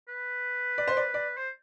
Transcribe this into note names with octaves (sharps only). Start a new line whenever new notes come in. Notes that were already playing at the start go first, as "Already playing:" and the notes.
B4
D5
C5
D5
D5
C5